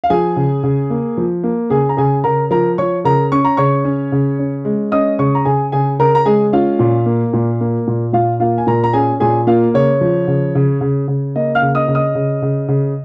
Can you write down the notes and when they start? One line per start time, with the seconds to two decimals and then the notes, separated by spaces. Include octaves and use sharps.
0.04 F5
0.10 F3 G#4 G#5
0.36 C#3
0.63 C#3
0.90 A#3
1.17 F3
1.44 A#3
1.70 C#3 G#4 G#5
1.89 A#5
1.97 C#3 G#4 G#5
2.24 C#3 A#4 A#5
2.51 F3 A#4 A#5
2.78 F3 C#5 C#6
3.05 C#3 A#4 A#5
3.32 C#4 C#6
3.45 A#5
3.57 C#3 C#5 C#6
3.85 C#4
4.12 C#3
4.39 C#4
4.65 G#3
4.92 C#4 D#5 D#6
5.19 C#3 C#5 C#6
5.35 A#5
5.45 C#3 G#4 G#5
5.72 C#3 G#4 G#5
5.99 C#3 A#4 A#5
6.15 A#5
6.26 G#3 G#4 G#5
6.52 C#4 F4 F5
6.79 A#2
7.06 A#3
7.33 A#2
7.61 A#3
7.87 A#2
8.13 A#2 F4 F5
8.40 A#3 F4 F5
8.58 G#5
8.67 A#2 A#4 A#5
8.84 A#5
8.93 C#4 G#4 G#5
9.20 A#2 G#4 G#5
9.47 A#3 F4 F5
9.74 C#3 C#5
10.01 F3
10.28 C#3
10.55 C#3
10.81 C#3
11.08 C#3
11.36 A#3 D#5
11.55 F5 F6
11.62 C#3
11.75 D#5 D#6
11.88 C#3
11.95 D#5 D#6
12.15 C#3
12.42 C#3
12.68 C#3